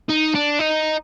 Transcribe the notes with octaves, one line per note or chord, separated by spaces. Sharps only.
D#4
D4
D#4